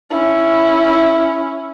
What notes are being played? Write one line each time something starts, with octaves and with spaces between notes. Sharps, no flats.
C#4 E4